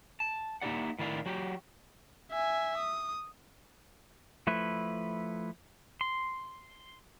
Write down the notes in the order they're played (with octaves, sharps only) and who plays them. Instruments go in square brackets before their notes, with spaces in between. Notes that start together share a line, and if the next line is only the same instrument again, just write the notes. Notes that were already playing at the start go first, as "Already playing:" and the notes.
[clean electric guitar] A5
A#3 D#4 E4 G4 D5 F#5
A2 D#3 E4 D5 F5
F#3 F#4 G4
[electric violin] E5 G#5
D#6
[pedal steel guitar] F3 A3 E4 B4
C6